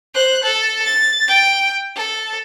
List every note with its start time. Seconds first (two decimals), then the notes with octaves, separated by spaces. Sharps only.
0.14 C5 F#6
0.43 A4
0.85 A6
1.28 G5
1.96 A4